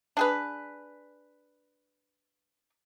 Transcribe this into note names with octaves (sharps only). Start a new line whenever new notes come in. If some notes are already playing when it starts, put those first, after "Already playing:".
D4 G#4 B4